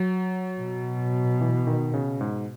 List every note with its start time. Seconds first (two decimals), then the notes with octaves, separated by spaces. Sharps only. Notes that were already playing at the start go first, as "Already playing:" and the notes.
Already playing: F#3
0.60 B2
1.41 E3
1.67 D#3
1.94 C#3
2.21 G#2